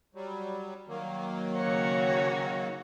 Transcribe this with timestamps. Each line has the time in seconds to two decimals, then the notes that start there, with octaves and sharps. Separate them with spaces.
0.15 F#3 G3
0.88 D#3 F#3 A#3
1.55 C#3 F#4 C#5